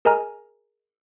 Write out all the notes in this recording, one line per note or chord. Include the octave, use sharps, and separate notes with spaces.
G#4 A#4 D#5 G#5 A#5 F6